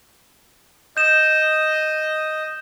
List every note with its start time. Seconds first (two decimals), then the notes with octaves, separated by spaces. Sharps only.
0.97 D#5 G6 E7